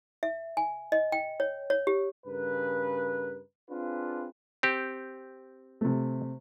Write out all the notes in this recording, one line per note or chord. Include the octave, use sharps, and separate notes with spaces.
E5
G#5
D#5
G5
C#5
C#5
G4
G2 C#3 A#4 B4
C4 D4 F4 G#4 B4
C4 G4
C3 A3